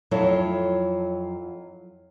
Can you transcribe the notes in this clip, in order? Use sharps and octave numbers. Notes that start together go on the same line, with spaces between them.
F2 F#3 E4 F4 A4 C#5